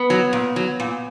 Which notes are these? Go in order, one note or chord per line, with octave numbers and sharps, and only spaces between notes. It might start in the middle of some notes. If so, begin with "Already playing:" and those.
Already playing: B3
F#3
A#2
F#3
A#2